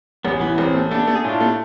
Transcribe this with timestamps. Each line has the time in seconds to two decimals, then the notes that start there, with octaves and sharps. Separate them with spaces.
0.24 A1 B3
0.40 E3 B3
0.58 A1 C4
0.74 A3
0.91 A3 B3 D4
1.08 A3
1.15 G#4
1.24 A2 D4 F4
1.41 A3